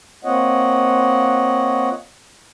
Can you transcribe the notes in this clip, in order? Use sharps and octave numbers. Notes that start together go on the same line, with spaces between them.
A#3 C4 F4 C#5 D#5 F#5